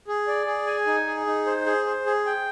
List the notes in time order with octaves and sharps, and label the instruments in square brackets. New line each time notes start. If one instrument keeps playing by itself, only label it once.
[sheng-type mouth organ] G#4
D5
G#4
G#5
D#4
G#4
D#4
C5
G#4
C5
G#4
G5